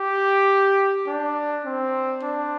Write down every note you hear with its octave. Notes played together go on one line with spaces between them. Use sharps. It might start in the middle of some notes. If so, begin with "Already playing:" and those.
Already playing: G4
D4
C4
D4